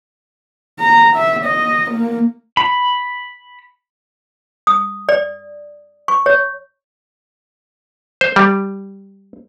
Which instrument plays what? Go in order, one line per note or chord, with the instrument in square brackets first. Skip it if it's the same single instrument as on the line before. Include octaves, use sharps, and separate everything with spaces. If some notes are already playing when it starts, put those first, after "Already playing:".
[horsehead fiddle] A#5
E5
D#5
A#3
[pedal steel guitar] B5
[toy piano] D#6
D5
C#6
C#5
[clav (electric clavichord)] C5
G3